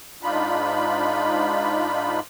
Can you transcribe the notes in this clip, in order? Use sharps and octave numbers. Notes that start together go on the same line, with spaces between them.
G#2 D4 D#4 F4 B5